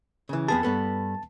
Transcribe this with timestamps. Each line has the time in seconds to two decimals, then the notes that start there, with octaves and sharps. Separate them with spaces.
0.29 C#3 E3
0.49 F2 B3 G#4 A5
0.63 G2 B3 A4